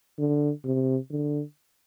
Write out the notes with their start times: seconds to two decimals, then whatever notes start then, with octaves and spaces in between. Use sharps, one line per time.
0.18 D3
0.64 C3
1.10 D3